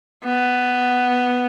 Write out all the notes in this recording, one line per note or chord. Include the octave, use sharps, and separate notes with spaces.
B3